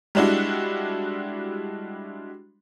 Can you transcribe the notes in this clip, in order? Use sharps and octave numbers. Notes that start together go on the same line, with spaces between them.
G3 G#3 D4 E4 F#4